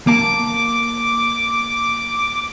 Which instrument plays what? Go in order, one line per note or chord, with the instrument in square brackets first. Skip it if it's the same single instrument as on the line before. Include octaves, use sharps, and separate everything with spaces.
[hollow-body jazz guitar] A#3 A5 [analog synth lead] D6